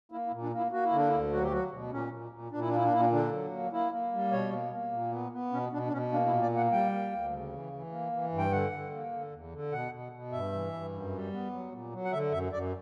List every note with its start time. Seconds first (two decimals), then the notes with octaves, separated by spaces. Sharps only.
0.12 A#3 E4
0.27 E4
0.32 A#2
0.43 D4
0.52 A#3 E4
0.72 A#3 F#4
0.85 E4
0.92 D3 D4
1.09 E4
1.13 D2
1.33 F#3 F#4
1.43 G4
1.51 F#3 F#4
1.72 B2
1.92 A#2 C#4
2.12 A#2
2.32 A#2
2.52 A#2 D4
2.61 E4
2.68 D4
2.72 A#3 E4
2.85 D4
2.92 A#2 E4
3.00 D4
3.12 D3 D4
3.32 F#3
3.52 A#3
3.72 A#3 E4
3.92 A#3
4.12 G3
4.32 B2 C#5
4.52 A#3
4.72 A#3
4.93 A#2
5.12 B3
5.32 B3
5.52 B2 C#4
5.72 B2 D4
5.88 D4
5.92 B2 C#4
6.12 A#3 D4
6.27 E4
6.32 A#2
6.42 D5
6.53 A#3 F#5
6.72 G3 G5
6.93 A#3
7.13 D2
7.33 C#3
7.53 E3
7.73 E3
7.92 A#3
8.12 E3
8.32 G2
8.38 G5
8.52 D3 F#5
8.72 D3
8.92 A#3
9.12 D3
9.32 E2
9.52 D3
9.72 B2 F#5
9.92 B2
10.12 B2
10.32 G2 E5
10.53 E3
10.73 G2
10.93 F#2
11.12 G3
11.33 B3
11.52 F#3
11.72 A#2
11.92 F#3
12.05 F#5
12.12 D3 E5
12.32 F#2 E5
12.52 F#2 D5